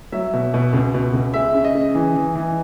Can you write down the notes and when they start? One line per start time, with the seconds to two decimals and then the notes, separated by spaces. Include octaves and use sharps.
0.12 F#3 E5
0.33 B2
0.54 B2
0.73 C#2
0.94 B2
1.13 C#2
1.34 G#3 E5
1.54 C#3
1.64 D#5
1.75 C#3
1.95 E3
2.16 E3
2.35 E3